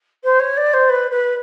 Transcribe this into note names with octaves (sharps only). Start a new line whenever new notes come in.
C5
C#5
D5
C5
B4
B4